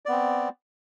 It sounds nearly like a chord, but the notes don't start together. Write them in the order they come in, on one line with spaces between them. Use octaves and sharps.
D5 B3 C4